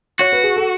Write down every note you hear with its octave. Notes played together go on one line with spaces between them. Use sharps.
F#4 C#5
B4
G#4
A4